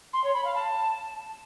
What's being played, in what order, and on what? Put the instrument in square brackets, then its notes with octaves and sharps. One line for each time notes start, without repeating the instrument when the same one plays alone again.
[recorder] C6
C#5
B5
F5
A5